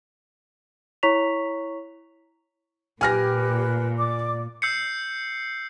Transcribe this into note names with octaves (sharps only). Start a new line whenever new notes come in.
E4 C#5 A#5 C#6 B6 F7
A#2 G4 B4 G#5 F6 A#6
D5 D6
E6 G6 C7 C#7